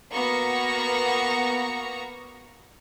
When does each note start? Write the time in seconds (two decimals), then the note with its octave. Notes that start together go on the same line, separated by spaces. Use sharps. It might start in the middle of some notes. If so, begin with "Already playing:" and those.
0.14 A#3 B3 F#4 A#5 C#6